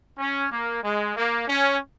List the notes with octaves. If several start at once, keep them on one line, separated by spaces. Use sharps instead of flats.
C#4
A#3
G#3
A#3
C#4